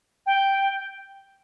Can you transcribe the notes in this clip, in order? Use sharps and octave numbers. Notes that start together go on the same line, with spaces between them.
G5